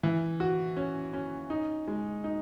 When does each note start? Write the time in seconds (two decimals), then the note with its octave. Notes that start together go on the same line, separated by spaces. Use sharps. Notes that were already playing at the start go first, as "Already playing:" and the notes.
0.03 E3
0.40 F#4
0.76 C#4
1.13 C#4
1.50 D#4
1.88 G#3
2.24 D#4